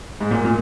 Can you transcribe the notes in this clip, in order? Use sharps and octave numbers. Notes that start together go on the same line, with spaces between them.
G#2
A#2
A#2